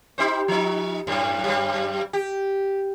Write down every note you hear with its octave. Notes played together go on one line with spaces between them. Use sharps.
D#4 G4 C5
F3 D#4
F#2 A2
F#2 G3
G4